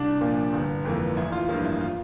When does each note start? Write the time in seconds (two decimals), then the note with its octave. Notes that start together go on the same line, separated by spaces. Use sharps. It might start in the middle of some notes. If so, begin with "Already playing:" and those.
Already playing: C2 D4
0.21 A#2 F3 A#3
0.53 G1
0.85 F2 E3 A#3
1.16 A1 E4
1.32 F4
1.48 G2 F3 A#3 F4
1.64 E4
1.81 F4